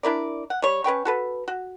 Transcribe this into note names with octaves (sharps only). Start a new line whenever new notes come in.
D4 E4 A#4 D5
F#5
G3 C#5
C#4 B4 G5 C#6
F#4 A4 B4
F#4